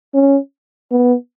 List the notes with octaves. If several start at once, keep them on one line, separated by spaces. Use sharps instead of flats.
C#4
B3